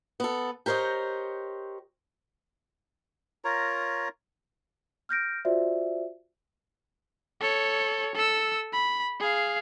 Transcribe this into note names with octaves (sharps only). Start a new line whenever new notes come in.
B3 A4
G4 A#4 C5 C#5 D#5
F4 A#4 C#5 A#5
F6 G6 A#6 D7
F4 F#4 C5 D5 E5
A4 C#5
A4 E6
B5
G#4 F5